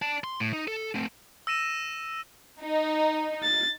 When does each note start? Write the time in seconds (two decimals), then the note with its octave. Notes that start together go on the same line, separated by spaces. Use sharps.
0.02 D5 A5
0.24 C6
0.40 A2
0.53 D#4
0.68 A4
0.95 A3 C4
1.47 E6 A#6 D#7 E7
2.61 D#4
3.43 A6